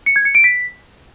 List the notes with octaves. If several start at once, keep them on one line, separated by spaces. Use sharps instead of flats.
C#7
G#6
C#7
D7
B6